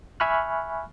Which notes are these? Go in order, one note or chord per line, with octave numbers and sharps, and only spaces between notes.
E5 G#5 B5 C#6 F6 F#6